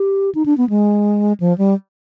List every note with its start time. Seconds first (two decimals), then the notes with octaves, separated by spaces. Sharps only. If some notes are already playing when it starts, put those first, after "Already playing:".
Already playing: G4
0.35 D#4
0.46 D4
0.57 B3
0.69 G#3
1.40 F3
1.58 G3